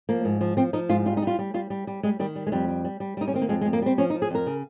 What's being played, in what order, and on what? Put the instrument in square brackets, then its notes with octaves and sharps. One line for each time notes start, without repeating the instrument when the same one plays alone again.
[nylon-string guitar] F3 A#3
G#2
F3
F3 C4
F3 D#4
G#2 F4
G3 F4
D#4
G3
F4
G3
G3 F4
G3
G3
G3 G#3
D#3 G3
G3
G#3
F2 G3
G3
G3
G3
G3 D#4
C#4
D#3 C4
A#3
F2 G#3
G#3
F2
A#3
G3 C4
F3 C#4
D#4
F3
G#4
F2 A#4
C#3